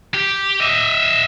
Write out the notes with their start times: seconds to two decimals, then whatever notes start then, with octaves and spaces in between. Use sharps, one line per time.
0.14 G4
0.60 D#5 E5